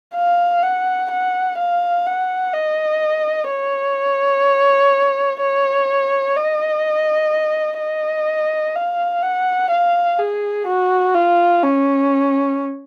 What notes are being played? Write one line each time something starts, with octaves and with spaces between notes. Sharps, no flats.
F5
F#5
F#5
F5
F#5
D#5
C#5
C#5
D#5
D#5
F5
F#5
F5
G#4
F#4
F4
C#4